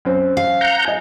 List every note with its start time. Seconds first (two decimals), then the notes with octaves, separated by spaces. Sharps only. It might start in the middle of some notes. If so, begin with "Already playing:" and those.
0.05 F#2 C4
0.37 F5
0.61 F#5 A#5 G6
0.85 D#5 G#5